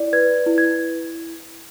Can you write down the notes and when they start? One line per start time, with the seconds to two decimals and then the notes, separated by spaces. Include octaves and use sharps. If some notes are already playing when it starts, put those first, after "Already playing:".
Already playing: E4 D5
0.13 B4 G#6
0.46 E4
0.58 G#6